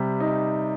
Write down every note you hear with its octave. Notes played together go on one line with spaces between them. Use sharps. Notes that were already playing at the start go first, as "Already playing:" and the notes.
Already playing: C3 G3
D#4